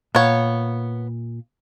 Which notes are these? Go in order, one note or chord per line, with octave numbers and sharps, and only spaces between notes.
A#2 B3 C#5 F5